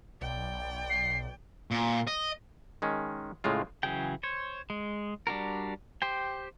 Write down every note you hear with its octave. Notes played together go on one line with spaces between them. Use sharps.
B1 D5 G5
C7
A#2
D#5
D#3 G#3 C#4
A2 C#3 G#3 F4
C#3 E3 F#3 G#4 G5
C5 C#5
G#3
G3 D4 F#4 A#4
G4 C5 G5